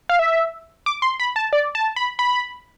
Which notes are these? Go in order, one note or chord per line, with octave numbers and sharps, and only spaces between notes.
F5
E5
D6
C6
B5
A5
D5
A5
B5
B5